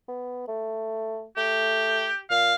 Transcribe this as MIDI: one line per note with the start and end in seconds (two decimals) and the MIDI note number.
0.08 0.47 59
0.48 1.25 57
1.37 2.08 57
1.37 2.18 67
2.30 2.53 46
2.30 2.55 77